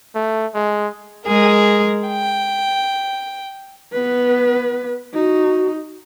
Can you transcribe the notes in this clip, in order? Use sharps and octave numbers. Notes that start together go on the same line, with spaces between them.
A3
G#3
G#3 G#4 A#4
G5
B3 B4
D#4 F#4